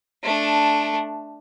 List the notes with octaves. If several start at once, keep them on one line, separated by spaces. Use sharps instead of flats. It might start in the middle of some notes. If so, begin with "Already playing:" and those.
A3 D4